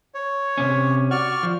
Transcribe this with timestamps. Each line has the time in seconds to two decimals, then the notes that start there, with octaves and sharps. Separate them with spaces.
0.14 C#5
0.58 C3 C#4
1.11 F#4 D5 C#6 F6
1.43 F3